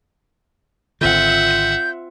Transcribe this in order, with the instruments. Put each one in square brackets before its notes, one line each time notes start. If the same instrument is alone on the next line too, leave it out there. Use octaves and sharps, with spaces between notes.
[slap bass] G#1 D3 [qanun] C4 F4 [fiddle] E5 F#5 [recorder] G6